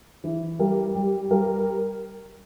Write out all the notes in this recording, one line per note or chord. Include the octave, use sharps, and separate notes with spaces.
E3
G3 A#4
G3
G3 A#4